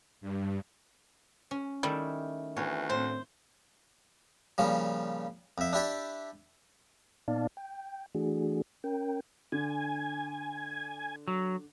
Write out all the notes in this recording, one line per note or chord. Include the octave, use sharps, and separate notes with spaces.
G2
C#4
D#3 G3 A3 E4
D2 E3 B3 C#5
A2 C4 C5
A#2 C#3 F3 G3
F2 E5
D4 E4 G4 D5
A#2 B3 D#4 D5 F5 A5
G5
E3 A3 D4 F#4 G#4
C#4 A#4 G5
D3 G#5
F#3